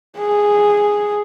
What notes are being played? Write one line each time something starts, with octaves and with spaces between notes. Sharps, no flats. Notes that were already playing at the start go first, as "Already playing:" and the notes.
G#4